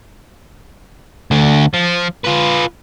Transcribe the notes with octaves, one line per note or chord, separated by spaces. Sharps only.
D2 D3
F3
F4 B4